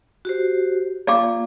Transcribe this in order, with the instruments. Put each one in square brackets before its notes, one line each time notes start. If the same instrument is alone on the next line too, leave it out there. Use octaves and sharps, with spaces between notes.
[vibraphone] F#4 G4 C5
[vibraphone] A#3 F4 [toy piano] D5 F5 D6